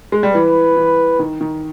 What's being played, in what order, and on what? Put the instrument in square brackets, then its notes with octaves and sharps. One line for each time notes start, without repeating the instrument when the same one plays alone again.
[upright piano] G#3
G3
[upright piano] E3 [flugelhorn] B4
[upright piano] E3
D#3
D#3